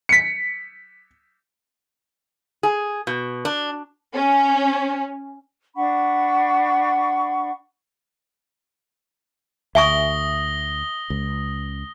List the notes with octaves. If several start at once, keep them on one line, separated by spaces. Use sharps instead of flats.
B6 C#7
G#4
B2
D4
C#4
D4 F#5 B5 C#6
D2 E5 G#5 C#6 D#6 A#6 G7
C#2